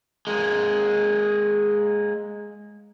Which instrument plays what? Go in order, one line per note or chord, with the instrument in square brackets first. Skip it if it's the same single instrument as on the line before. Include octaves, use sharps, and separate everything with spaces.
[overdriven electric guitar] G#3 A#3